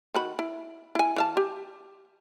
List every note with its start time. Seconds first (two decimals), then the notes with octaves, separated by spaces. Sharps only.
0.14 D#3 F#4 B5
0.39 E4
0.95 E4 G#5
1.16 E3 F5 A5
1.37 G4